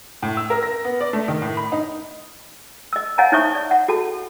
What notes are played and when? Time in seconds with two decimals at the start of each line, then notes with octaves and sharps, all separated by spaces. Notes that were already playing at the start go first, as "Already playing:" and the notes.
0.23 A2
0.37 E6
0.50 A#4
0.63 A#6
0.85 B3
1.01 D5
1.13 A3
1.28 D#3
1.42 A2
1.57 B5
1.72 D#4
2.93 D#5 E6
3.18 C#5 D#5 F5 F#5 G#5 A#5
3.32 D#4 C5 C#5 E5 C#6 D#6
3.55 D5
3.71 F#5
3.88 F#4 A4 A5